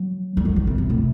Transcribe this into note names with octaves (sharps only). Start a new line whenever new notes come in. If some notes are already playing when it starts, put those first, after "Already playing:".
Already playing: F#3
G3
F#3
D#3
C3
C3
A2